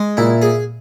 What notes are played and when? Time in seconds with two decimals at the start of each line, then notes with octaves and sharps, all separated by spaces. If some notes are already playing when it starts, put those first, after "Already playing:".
Already playing: G#3
0.17 A#2 E4
0.42 G#4